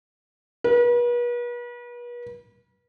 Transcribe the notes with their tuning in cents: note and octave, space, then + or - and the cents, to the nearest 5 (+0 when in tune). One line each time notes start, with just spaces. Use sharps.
B4 -40